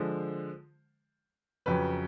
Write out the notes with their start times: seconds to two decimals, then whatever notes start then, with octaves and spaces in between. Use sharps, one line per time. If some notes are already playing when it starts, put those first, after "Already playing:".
Already playing: D3 F3 G#3 C5
1.66 F2 C#3 F#3 B4